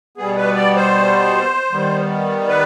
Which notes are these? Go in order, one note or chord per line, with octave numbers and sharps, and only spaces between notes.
B2 G3 B3 G#4
B4
D5
C5
D#3 G3 B3
B4